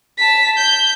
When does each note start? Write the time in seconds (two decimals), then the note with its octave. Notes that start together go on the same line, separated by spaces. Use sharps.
0.18 A5 B6
0.57 G6